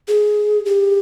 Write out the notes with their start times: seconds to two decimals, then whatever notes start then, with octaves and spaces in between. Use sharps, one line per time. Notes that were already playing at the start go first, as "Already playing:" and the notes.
0.08 G#4
0.66 G4